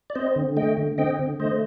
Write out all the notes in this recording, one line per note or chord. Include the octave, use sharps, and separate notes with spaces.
D5
C4 C5 D#5
D3
A3 D#5 G5
D3
C4 D#5 G5
D3
A3 C5 D#5